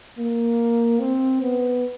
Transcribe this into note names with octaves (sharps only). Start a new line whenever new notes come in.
A#3
C4
B3